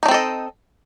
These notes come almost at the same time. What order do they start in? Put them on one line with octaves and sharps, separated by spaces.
D#4 D4 C4 A4 D#5